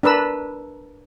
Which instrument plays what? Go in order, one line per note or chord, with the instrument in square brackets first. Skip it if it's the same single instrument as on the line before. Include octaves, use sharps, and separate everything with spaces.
[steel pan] D4 A#4 B4 E6